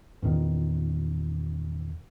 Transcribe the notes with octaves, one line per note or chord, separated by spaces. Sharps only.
E2 A#2 D#3